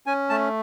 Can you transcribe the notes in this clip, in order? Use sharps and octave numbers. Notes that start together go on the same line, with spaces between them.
C#4 G#5
A3 A5